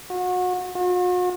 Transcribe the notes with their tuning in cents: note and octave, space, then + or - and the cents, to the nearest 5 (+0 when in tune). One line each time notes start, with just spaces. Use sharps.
F#4 -30
F#4 -45